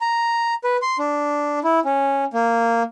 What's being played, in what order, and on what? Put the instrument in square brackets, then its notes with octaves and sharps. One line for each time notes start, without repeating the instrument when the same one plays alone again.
[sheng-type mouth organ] A#5
B4
C6
D4
E4
C#4
A#3